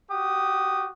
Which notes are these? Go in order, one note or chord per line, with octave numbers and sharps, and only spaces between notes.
F#4 G4 D#6